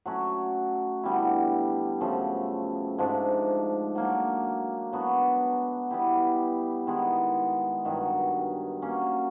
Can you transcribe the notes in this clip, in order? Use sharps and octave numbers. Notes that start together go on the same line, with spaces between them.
F#3 A3 C#4 F#4
D3 G3 B3 E4
F#2 C#3 F3 A3
G#2 F3 A3 D4
F#3 A#3 D4
F#3 B3 D4 F#4
G3 B3 E4 G4
D#3 G#3 B3 E4
G2 D#3 F#3
F#3 A#3 C#4